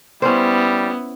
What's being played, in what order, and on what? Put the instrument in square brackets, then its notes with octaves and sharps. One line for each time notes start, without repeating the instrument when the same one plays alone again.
[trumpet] G3 [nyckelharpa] B3 E4 [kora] C#4 C5